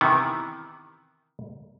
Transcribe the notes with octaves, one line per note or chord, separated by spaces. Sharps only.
C3 D#3 E3 B3